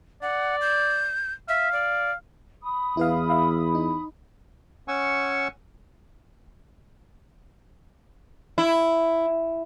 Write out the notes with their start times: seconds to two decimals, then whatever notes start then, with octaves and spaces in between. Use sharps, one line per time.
0.22 D5 F#5
0.61 G6
1.49 E5 F5
1.72 D5
2.62 B5 D#6
2.97 E2 E4 B4 F5
3.30 E5 F5
3.75 D#4
4.88 C#4 F#5 G#5 C#6 E6
8.58 E4